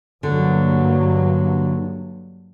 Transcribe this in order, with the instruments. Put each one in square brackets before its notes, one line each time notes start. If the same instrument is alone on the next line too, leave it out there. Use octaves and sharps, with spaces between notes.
[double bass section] G2 F#3 A#3 [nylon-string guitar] D3